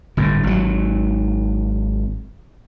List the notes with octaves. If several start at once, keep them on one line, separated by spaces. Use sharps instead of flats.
G1 A2
G#1 F#3